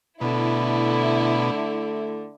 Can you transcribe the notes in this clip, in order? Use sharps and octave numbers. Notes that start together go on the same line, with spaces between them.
B2 D3 A3 E4